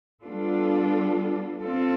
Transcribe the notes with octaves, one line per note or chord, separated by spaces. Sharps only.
G3 B3 D4 F4 A4
C4 F4 A4